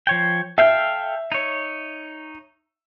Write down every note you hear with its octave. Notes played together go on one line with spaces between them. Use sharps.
F3 C#5 G5
A4 E5 F5 G5
D#4 C#5